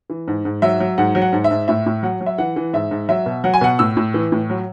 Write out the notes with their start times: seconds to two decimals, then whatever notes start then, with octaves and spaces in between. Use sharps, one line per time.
0.10 E3
0.28 G#2
0.45 G#2
0.62 F#3 E5
0.80 F#3
0.98 G#2 F#5
1.15 F#3
1.22 F#5
1.33 G#2
1.44 E5
1.51 G#2
1.68 A2 E5
1.86 A2
2.03 F#3 F#5
2.21 F#3
2.26 E5
2.38 E3 F#5
2.56 E3
2.73 G#2 E5
2.91 G#2
3.09 F#3 E5
3.26 B2
3.44 F#3 F#5
3.54 G#5
3.61 B2 F#5
3.79 A2 E6
3.97 A2
4.14 E3
4.32 A2
4.50 F#3